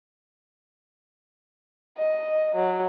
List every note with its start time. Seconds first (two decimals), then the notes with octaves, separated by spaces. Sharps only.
1.98 D#5
2.55 F#3